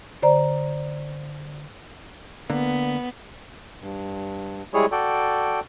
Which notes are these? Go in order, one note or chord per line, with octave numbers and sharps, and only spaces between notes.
D3 C5 D5 A#5
D3 A#3 B3
G2
G3 G#3 E4 G#4 C#5
F#4 A4 D5 G5